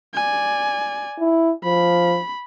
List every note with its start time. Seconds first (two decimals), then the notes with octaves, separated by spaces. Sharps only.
0.14 D5 G#5
1.20 E4
1.64 F3 B5